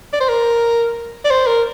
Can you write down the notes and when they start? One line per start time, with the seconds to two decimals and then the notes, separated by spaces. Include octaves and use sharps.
0.13 D5
0.20 C5
0.29 A#4
1.25 D5
1.30 C5
1.47 A#4